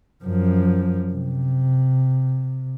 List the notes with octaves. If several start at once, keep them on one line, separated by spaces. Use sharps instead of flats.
F#2 F3
C3